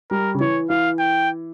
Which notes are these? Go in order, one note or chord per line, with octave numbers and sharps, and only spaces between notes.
G3 A#4
C#3
E3 C#5
E3 F5
G5